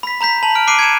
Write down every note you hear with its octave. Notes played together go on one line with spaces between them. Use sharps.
B5 B6
A#5 B5 G6 B6
A5 B5 F7 F#7
F6 D7
D6 F#6 C7 D7 D#7
G#6 C#7 E7